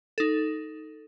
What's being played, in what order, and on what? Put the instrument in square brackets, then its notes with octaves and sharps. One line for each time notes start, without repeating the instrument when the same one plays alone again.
[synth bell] D#4 A4